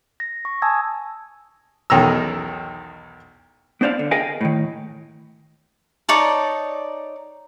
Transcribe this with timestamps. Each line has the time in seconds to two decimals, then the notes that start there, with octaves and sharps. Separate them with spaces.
0.20 A#6
0.45 C#6
0.62 G#5 A5 D#6 E6 G#6
1.90 B1 E2 D#3 C#4 A#5 E6
3.81 B3 D4 C5 D5 F5
3.99 D3
4.11 G#4 A#4 D#5 F5 G5 G#5
4.41 A2 D#3
6.09 D#4 C#5 D5 A5